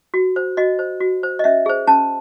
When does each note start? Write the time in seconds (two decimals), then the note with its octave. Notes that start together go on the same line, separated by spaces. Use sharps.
0.14 F#4
0.36 C5
0.57 F#4 D#5
0.79 C5
1.00 F#4
1.23 C5
1.39 D#5
1.44 C#4 E5
1.66 G#4 C5
1.87 C#4 A5